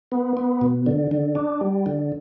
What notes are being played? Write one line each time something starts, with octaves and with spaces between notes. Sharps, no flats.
B3
B3
B2
D3
D3
D4
G3
D3